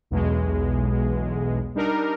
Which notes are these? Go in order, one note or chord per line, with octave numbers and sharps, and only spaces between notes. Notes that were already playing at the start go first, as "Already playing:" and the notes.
B1 E2 B2 G#3
G3 D4 D#4 A#4